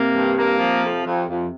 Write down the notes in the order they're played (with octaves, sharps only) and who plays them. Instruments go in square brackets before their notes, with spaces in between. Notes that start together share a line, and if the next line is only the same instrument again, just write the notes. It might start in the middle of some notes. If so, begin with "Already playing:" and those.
Already playing: [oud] C3 [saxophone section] A#3
[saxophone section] G2
A#3
F3
F2
F2
F2